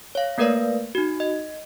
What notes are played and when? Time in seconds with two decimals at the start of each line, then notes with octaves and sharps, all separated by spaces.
0.15 C#5 F5
0.38 A3 A#3 A#4 B4 D5 F5
0.95 D#4 F#4
1.20 D#5